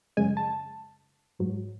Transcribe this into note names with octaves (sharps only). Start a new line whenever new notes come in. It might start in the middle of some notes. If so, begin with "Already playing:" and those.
F#2 C#3 G#3 G#5
A5
G#1 G#2 F#3